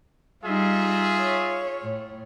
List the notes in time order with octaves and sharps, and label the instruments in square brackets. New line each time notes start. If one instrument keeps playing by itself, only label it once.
[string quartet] G3 D#4 [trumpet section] F4 G#4 E5
[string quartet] C#5
A2